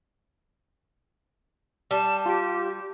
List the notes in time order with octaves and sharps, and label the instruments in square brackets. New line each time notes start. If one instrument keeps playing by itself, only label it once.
[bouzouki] G3 [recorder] A5
[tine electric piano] F4 [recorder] G4